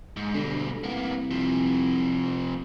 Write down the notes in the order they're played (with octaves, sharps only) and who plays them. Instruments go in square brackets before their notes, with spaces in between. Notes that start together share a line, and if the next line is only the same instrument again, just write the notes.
[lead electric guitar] G#2
[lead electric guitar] B2 G3 [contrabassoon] D3
[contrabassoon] C2 [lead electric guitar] A#3 B3
[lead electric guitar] C3 F3